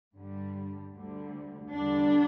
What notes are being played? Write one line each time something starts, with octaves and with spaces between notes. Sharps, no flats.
G2 D3 G3
D2 D3 G3
E2 D3 G3 D4